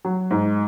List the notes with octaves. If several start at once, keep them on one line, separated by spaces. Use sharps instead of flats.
F#3
G#2